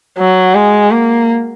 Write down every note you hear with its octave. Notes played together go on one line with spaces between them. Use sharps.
F#3
G#3
A#3